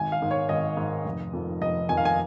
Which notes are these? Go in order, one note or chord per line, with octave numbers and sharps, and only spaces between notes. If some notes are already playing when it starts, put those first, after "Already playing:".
Already playing: G#1 G#5
F5
G#2 D#3
C#5
G#1 D#5
G#2 D#3
F1
F2 D#3
F1 D#5
F2 D#3 G#5
F5
G#5